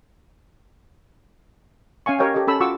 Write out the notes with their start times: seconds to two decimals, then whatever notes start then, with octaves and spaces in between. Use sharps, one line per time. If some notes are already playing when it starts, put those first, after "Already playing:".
2.06 C#4 F5 G#5 C#6
2.19 G4 A#4 C#5 D#5 F5 G5
2.34 G4 A4 A#4 D#5
2.47 C#4 A4 B5 E6
2.60 F4 F#4 F#5 C#6 D6 E6